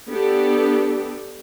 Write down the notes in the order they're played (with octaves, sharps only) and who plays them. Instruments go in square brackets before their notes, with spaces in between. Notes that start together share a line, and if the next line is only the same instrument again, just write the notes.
[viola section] B3 D4 G4 A4